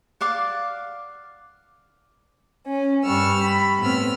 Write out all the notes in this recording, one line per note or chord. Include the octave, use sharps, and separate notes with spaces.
D5 F5 F#5
C#4
G2 G3 C#6 E6 F6
B5
A2 B3 C4 E6 F6